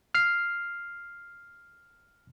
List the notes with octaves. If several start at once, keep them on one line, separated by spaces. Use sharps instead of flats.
F6 C7